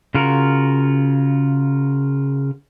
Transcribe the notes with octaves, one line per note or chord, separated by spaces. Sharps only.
C#3 F4 F#4 A#4